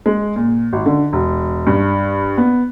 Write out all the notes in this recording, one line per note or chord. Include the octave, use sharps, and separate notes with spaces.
G#3
A#2
G#1
D3
E1
G2
B3